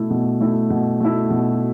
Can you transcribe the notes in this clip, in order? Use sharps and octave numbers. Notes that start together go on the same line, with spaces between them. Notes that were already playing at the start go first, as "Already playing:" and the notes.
Already playing: B2 A3 E4
B2
A3 E4
B2
A3 E4
B2